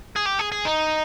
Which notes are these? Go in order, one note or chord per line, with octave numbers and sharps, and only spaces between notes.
G#4
G4
G#4
G#4
D#4